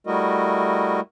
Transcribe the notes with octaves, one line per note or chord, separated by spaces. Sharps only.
G3 A3 E4 F#4 A#4 D#5